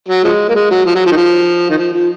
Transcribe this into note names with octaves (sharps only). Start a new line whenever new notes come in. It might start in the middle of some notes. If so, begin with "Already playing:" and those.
F#3
F3 G#3
A#3
G#3
F#3
F3
F#3
F3
D#3
F3
D#3
F3
F3